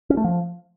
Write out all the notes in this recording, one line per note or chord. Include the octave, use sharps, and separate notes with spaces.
C#4
A3
F3